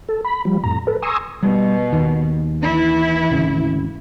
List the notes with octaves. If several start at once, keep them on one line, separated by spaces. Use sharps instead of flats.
A4
B5
F3 G3
F2 A2 A#5
A4 B4
G#5 A#5 C6 C#6 D#6 E6
B2 G3
D#2 D#3
E3 E4
G#1 D2 C#3